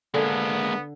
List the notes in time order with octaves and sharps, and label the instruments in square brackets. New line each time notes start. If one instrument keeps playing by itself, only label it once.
[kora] D3 [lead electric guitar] G#3 A#3 [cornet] B3